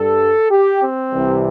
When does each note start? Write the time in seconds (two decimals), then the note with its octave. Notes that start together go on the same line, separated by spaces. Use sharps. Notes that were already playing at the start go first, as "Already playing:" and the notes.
Already playing: G2 G3 A4
0.51 G4
0.81 C4
1.12 C2 C3 E3 G3